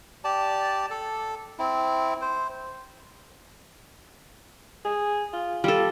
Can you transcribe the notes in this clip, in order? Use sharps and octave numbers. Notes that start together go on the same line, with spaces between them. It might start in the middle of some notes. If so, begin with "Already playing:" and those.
G4 D5 A5
A4
C4 E4
C5
G#4
F4
G3 F4 A4